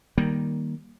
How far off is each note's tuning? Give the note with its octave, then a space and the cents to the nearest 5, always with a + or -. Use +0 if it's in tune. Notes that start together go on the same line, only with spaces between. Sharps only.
D#3 +0 G3 +0 A#3 +15